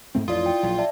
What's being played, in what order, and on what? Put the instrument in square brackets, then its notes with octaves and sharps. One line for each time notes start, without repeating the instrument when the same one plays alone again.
[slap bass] G#2 A3 C4
[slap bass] A1 F2 [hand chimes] E4 D5 D#6 [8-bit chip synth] F4
[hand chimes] G5
[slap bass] A#1 F#3
[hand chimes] D5 E5 A5